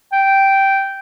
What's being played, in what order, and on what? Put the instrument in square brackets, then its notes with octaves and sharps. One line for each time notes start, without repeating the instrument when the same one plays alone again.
[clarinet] G5